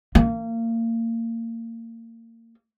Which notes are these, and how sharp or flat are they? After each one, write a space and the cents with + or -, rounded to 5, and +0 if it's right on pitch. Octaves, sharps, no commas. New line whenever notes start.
A#3 -30